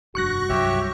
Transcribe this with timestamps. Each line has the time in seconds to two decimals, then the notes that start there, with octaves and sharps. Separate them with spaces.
0.15 F1 G2 F#4 C#6 F#6 A#6
0.49 C2 G2 F#3 G4 C#5 E5